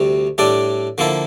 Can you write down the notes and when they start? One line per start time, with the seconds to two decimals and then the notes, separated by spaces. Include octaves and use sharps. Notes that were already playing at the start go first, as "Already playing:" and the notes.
Already playing: D2 C3 G3
0.38 A2 G3 D4 A4 D5
0.98 D3 F3 A#3 E4 A4